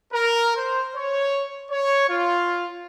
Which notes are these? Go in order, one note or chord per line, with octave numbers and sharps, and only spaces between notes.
A#4
C5
C#5
C#5
F4